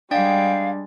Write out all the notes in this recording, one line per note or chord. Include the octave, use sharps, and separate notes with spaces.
G3 G#3 D4 D5 F5 G5